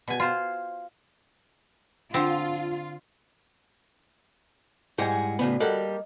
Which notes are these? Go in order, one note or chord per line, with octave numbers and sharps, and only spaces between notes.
B2 G#5
F4 C5
D3 C4 F4
G#2 G3 G#3 E4 F#5 G#5
A2 C#3 B3 F#4 D5 B5
G3 A#3 A4 D#5 F#5